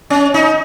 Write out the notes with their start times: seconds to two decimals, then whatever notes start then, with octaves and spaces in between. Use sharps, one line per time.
0.10 C#4
0.34 D#4